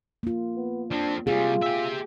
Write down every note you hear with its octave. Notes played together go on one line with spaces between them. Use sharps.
A#3 F4
B3
F3 C4 D4
C3 G3 F4 G#4
G4 E5